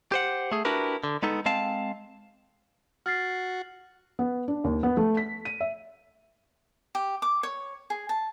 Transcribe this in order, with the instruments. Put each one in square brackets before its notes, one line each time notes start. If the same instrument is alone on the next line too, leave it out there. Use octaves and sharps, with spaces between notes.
[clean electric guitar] G4 C5 F#5
A3 G#4
D4 E4 F#4 G4 A#4 B4
D3
G#3 B3 D#4 A4
G#3 C4 F5 A5
[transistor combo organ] F#4 [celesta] F6 A6 C7
[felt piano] B3
D4
D#2
B3
A3
B6
D#7
E5
[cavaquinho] G4
D6
C#5
G#4
A5